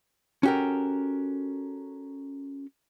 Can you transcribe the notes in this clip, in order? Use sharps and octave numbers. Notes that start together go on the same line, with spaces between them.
C#4 F#4 G4 A4 A#4